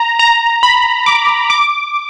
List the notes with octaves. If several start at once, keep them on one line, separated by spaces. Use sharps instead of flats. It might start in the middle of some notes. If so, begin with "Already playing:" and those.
Already playing: A#5
A#5
B5
D6
D6